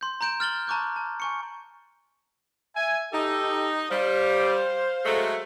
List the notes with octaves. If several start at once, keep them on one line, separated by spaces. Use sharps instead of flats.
C6 G6
A#5 C6 G6 D7 E7
F6 A6 F#7 G7
A5 A#5 C#6 D6 F#6 G6
A5
G#5 C#6 C#7
E5 G#5
D#4 G4 A4
G3 C5 F5
F#3 G#3 A3